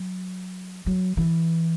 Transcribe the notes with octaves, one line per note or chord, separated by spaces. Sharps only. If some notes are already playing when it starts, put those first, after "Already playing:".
Already playing: F#3
F#3
E3